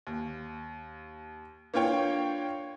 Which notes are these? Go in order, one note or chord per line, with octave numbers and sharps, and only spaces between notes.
D#2
A#3 D4 F4 C#5 G5